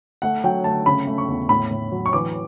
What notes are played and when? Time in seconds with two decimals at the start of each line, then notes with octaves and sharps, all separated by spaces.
0.22 A3 F#5
0.44 F#3 G5
0.64 A3 A5
0.86 C#3 B5
1.07 A3
1.18 C#6
1.28 E2
1.49 A2 B5
1.71 A2
1.92 F#3
2.06 C#6
2.13 E3 D6